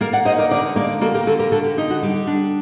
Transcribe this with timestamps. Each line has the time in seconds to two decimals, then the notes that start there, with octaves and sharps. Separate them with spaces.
0.01 A#3 A#4 D5
0.13 D5 F#5
0.25 D#4 C5 D#5
0.38 A#4 D5
0.51 D3 A#4 D5
0.76 A#3 A#4 D5
1.01 A#3 F#4 A4
1.14 G4 A#4
1.27 D3 F#4 A4
1.39 G4 A#4
1.52 D3 F#4 A4
1.65 G4
1.77 D#4 G4
1.91 F#4
2.03 G3 G4
2.27 D4